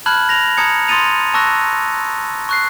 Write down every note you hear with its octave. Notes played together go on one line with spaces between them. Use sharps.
A5 B5 F6 F#6 G#6 F#7
A#6 F7
A5 A#5 D#6 G#6 C#7
C6 D#6 A6 C#7 D#7 F7
A5 C#6 E6 F#6 A#6
C#6 F#6 C7